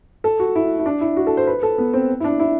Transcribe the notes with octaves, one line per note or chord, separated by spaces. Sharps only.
A4
F#4
E4
E4
D4
E4
F#4
A4
C5
B4
A4
B3
C4
E4
D4
E4